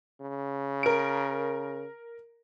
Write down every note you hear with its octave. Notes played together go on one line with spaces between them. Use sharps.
C#3
A#4 D7